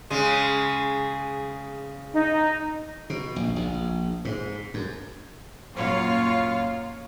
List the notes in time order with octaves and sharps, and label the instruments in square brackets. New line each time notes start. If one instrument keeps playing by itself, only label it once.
[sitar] C#3 G#3
[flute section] D#4
[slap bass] B2
A#1
A#1
G#2
F#2
[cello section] F#2 A#2 A#3 F4 C#5 F5